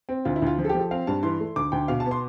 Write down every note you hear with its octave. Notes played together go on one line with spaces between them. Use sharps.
C4
D2 F4
E4
D2 F4
F3
A4
G4
F3 A4
C4 F5
G2 A5
E3 C6
A3
D2 D6
D2 G5
B2 F5
A5
B3
C6